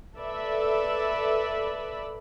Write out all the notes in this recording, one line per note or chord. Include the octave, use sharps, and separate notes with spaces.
A4 B4 D5 E5 B5